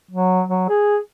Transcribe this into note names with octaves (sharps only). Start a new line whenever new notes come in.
F#3
F#3
G#4